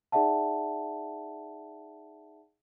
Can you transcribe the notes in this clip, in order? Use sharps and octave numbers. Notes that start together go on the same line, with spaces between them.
D#4 G#4 D5 E5 F#5 A5